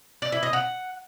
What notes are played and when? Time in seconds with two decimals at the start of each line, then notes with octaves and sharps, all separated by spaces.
0.22 D5
0.32 E4
0.43 D#5
0.53 F#5